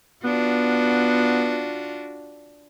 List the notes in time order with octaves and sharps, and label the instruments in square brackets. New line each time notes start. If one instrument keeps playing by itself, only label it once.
[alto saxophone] B3 [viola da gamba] D4 F4 F#4